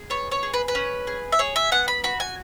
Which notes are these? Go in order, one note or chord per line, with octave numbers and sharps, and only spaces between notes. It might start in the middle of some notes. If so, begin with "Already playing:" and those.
Already playing: G#4
B3 C#5
C#5
G#4
B4
B4
C#4
G#4
E5
G#4 C#5
E5
B3 F#5
B5
F#4 B5
G#5